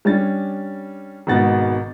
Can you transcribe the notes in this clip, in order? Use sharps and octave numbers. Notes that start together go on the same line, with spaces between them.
G3 C#4 D4 A6
G#1 G#2 B2 F#5 A6